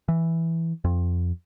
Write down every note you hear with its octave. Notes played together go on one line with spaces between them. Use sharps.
E3
F2